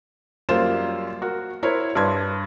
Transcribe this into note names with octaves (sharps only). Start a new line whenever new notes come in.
F#2 G3 A#3 F4 C5 E7
F#4 A#4
E4 A#4 C5 C#5
G2 D4 B4 C6 G#6